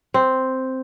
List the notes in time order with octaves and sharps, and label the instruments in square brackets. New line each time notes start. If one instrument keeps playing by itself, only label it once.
[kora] C4